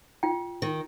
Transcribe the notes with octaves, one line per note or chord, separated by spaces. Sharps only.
F4 G5
D#3